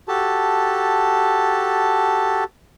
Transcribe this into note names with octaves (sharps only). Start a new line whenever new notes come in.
F#4 G4 A4 A5